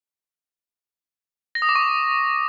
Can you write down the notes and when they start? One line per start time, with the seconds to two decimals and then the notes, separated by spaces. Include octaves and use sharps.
1.55 A#6
1.62 D#6
1.69 D6
1.75 C#6